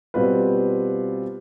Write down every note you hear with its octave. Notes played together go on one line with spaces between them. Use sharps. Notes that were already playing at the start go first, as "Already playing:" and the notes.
B2 G3 C4 F4 B4